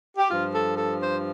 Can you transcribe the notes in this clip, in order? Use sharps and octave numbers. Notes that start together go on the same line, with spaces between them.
G4
G2 F3 F4
A4
A4
C5